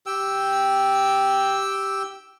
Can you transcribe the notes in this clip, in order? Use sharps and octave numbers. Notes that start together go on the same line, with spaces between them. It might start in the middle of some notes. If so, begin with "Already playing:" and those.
G4 G5 E6